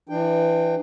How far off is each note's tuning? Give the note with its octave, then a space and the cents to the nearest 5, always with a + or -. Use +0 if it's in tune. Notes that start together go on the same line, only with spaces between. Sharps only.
E3 +15 D4 +35 G5 +5